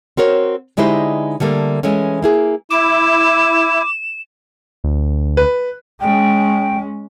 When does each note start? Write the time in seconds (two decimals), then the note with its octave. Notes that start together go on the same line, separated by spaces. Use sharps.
0.17 C4 F#4 A#4 C#5
0.77 D3 G#3 D#4 E4 G4 C5
1.40 D3 G3 A3 A#3
1.83 E3 G#3 A3 C#4
2.22 A#3 E4 G#4
2.71 E4 D6 E7
4.84 D2
5.37 B4
6.01 G#3 C#4 G5